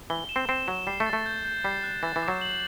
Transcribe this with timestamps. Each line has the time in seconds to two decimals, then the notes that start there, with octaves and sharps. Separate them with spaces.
0.10 E3 G7
0.29 E7
0.36 C4
0.49 C4 E7
0.68 F#3 E7
0.87 G3 C7
1.00 A3
1.06 A6
1.13 A3
1.26 G6
1.45 G6
1.64 G3 C7
1.84 F#6
2.03 E3 A6
2.16 E3
2.23 D6
2.28 F#3
2.41 F#7